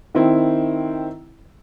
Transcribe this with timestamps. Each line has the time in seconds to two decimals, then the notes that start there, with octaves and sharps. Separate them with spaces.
0.15 D#3 C4 E4